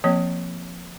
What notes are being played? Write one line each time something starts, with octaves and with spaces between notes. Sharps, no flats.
F3 A#3 C4 C#5